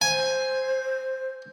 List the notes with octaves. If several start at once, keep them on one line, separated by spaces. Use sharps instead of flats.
C5 G#5